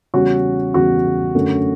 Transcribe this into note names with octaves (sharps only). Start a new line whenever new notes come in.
E2 C#3 G3 C#4 F#4
E2 C#3 G3 C#4 F#4
F#2 D3 A3 C#4